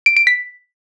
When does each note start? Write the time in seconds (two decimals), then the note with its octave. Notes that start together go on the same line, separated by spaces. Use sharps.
0.06 D7
0.17 D7
0.27 B6